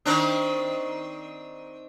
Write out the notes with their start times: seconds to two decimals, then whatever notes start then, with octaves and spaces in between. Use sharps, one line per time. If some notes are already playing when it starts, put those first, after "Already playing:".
0.06 D#3 C4 D4